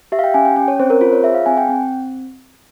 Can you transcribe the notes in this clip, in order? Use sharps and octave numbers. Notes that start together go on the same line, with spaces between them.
G4 E5
F5
G5
C#4 G#5
G5
C#4 G5
C#5
C4 C5
A#4
F4 C5
C#5
G#4 E5
F5
C4 G#5
G5
C4